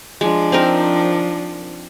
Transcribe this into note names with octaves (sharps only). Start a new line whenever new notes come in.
F3 G#3 D4
C4 D#4 A#4